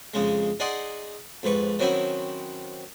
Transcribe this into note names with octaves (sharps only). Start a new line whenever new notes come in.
F2 C#3 G#3
D#4 G#4 D5 F#5 C6
F2 G#2 B4 C#6
D#3 F#3 C4 C#4 E4 F#4